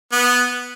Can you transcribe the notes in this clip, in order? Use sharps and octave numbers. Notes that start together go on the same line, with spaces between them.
B3